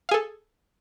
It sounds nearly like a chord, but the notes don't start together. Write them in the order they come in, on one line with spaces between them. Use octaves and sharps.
F5 G#4 A4